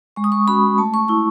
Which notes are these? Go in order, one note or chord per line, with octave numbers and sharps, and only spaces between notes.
G#3 C#6
D#6
C#6
C#4 F#4 B5
A3 A5
C#6
E4 C#6